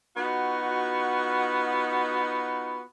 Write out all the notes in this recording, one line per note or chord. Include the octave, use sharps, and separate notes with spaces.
B3 D#4 F4 F#4